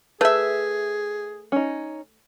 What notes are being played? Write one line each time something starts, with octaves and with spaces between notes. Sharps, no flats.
A3 G#4 B4 E5
C#4 D#4